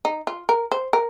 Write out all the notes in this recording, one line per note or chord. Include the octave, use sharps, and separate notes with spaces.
D#4
F4
A#4
C5
A#4